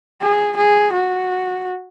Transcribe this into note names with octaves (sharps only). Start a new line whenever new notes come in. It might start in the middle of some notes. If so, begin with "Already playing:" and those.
G#4
G#4
F#4